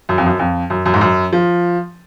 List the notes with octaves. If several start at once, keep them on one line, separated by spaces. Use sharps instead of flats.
F#2
F2
F#2
F2
F#2
F#2
G#2
F#2
F3